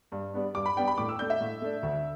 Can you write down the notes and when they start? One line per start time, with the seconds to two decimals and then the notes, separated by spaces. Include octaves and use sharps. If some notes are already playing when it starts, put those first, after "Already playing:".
0.12 G2
0.34 G3 B3 D4
0.55 G2 D6
0.66 B5
0.76 G3 B3 D4 G5
0.87 B5
0.98 A2 D6
1.09 E6
1.19 A3 D4 G6
1.30 E5
1.41 A2
1.62 A3 D4
1.83 D2